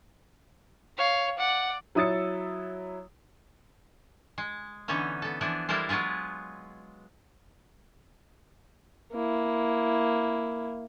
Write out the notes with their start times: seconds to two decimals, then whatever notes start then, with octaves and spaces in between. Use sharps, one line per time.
0.98 C#5 F5
1.38 D5 F#5
1.95 F#3 E4 D#6 E6 A6 C#7
4.38 G#3
4.88 D3 E3 B3 C#4 D#4
5.22 B3 A4
5.41 E3 F3 B3 D4 E4
5.69 G3 G#3 E4 A4 A#4 C5
5.89 F#3 G#3 B3 F4 G#4
9.12 A#3 E4